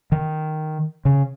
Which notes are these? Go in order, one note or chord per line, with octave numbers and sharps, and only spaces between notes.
D#3
C#3